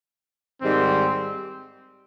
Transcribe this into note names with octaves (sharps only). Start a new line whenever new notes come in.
G#2 D#3 G3 C4